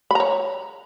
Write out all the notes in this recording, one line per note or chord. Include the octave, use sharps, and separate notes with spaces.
C#5 A#5 B5